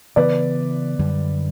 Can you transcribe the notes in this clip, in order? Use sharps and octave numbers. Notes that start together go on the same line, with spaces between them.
C#3 E3 B3 B4 D5
F#2 D3 G3